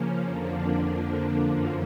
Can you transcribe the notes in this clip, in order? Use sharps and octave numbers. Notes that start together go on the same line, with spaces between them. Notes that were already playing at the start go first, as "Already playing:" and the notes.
Already playing: C#3 F3 A#3 C#4
F2 D3 F3 A#3 D4
F#2 D3 F3 A#3